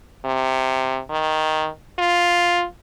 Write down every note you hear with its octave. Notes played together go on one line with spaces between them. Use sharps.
C3
D#3
F4